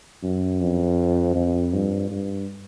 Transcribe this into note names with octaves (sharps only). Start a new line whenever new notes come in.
F#2
F2
F2
G2
G2